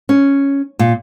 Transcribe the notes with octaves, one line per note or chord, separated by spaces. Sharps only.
C#4
A#2